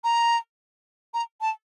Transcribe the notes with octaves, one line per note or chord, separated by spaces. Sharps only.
A#5
A#5
A5